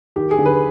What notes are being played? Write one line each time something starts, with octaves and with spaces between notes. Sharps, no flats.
D#2 G4
G#4
D3
B4